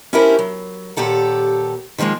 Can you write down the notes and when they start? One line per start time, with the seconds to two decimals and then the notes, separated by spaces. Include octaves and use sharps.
0.13 C#4 D4 E4 G4 A#4 C5
0.39 F#3
0.97 D#2 A#2 G4 A4 F#5
1.98 D#3 F3 F#3 G#3 A#3